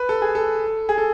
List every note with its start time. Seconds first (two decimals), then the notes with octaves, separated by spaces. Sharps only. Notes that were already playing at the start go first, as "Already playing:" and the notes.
Already playing: B4
0.09 A4
0.22 G#4
0.35 A4
0.89 G#4
0.98 A4